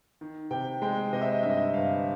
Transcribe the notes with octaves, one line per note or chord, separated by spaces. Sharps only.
D#3
C3 G5
G#3 G5
C3 D#5
E5
D#5
G2 E5
D#5
E5
G1 F5